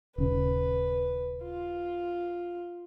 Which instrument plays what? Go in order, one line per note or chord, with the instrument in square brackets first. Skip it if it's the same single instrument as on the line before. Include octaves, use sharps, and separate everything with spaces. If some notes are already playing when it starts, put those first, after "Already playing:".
[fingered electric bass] D#1 C#3 [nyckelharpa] B4
[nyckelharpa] F4